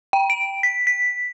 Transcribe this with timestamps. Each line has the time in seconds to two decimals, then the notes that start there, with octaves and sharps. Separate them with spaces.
0.13 G5
0.30 D7
0.63 B6
0.87 B6